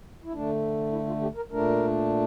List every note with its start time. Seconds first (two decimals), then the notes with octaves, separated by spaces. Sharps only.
0.25 E4
0.33 D3 A3 D4
0.92 E4
1.07 F4
1.21 G4
1.36 A#4
1.51 A#2 A3 D4 A#4